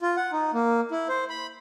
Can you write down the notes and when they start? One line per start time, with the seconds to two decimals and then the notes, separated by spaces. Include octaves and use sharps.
0.01 F4
0.17 F#5
0.32 D#4
0.54 A#3
0.91 E4
1.09 C5
1.30 B5